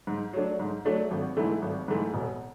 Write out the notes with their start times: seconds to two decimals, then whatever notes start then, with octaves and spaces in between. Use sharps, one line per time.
0.07 G#2
0.33 F#3 A3 D4
0.60 G#2
0.85 F#3 A3 D4
1.11 G#1
1.37 G#2 E3 A3 E4
1.62 G#1
1.88 G#2 E3 A3 E4
2.14 E1